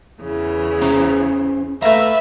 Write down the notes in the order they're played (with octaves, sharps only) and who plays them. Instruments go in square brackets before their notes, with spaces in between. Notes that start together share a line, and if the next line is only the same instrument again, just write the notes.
[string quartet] E2 C#3 E3
[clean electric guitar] C#4 C5 A#5
[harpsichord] A3 A#5 [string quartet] B4 [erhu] E5 [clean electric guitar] F5